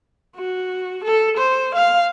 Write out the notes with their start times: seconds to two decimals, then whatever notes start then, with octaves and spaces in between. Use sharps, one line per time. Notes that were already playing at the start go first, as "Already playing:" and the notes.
0.36 F#4
1.05 A4
1.37 C5
1.75 F5